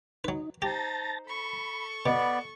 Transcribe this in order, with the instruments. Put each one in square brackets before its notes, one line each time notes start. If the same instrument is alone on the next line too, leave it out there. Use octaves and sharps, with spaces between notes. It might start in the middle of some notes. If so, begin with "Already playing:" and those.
[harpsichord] F#3 B4 [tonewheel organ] D#4
[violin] D#4 C5 [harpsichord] G4 [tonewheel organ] A5 A6 A#6
[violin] A4 C#6 [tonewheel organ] B5
[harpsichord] B2 [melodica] B3 D5 [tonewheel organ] B5